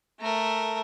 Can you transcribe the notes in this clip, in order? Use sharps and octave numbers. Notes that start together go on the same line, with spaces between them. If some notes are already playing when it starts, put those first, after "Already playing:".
A3 A#4